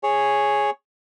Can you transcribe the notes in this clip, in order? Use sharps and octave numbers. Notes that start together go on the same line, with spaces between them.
G#4 C#5